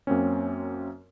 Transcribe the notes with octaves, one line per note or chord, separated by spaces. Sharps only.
F#2 A#3 C4 C#4